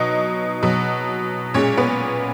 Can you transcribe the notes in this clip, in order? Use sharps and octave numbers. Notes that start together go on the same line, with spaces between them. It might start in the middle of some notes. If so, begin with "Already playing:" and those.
Already playing: B2 F#3 D#4 D#5
B2 F#3
A#2 G#3 C#4 C#5
B3 B4